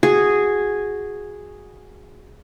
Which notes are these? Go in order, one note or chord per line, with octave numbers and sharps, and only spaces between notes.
F#4 G#4